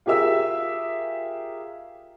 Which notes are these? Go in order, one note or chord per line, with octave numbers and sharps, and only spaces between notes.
F4 G4 G#4 A#4 E5 E6